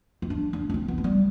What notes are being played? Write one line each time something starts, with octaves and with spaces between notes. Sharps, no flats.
C4
D4
D4
D4
C4
B3
G#3
G3